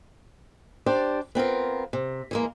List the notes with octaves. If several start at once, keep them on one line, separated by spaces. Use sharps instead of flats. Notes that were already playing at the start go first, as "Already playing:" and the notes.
D4 G4 C5 D5
B3 C4 F4 A#4
C3
E3 G#3 A#3